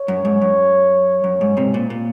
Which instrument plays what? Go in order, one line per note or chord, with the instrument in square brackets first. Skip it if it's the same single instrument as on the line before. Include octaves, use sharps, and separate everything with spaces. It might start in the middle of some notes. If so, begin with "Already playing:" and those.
Already playing: [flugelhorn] C#5
[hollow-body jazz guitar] F#2
G#2
F#2
F#2
G#2
G#2 C3
A#2
A#2